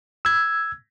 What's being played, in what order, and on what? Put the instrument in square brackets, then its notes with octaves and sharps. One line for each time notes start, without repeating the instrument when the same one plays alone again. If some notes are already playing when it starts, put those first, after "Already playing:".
[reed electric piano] E6 G#6